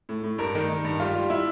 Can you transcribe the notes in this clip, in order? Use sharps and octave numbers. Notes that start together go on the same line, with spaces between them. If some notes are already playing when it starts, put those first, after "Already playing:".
A2
A2
G2 A#4
D#3
D#3
G2
G3 F4
G3
E4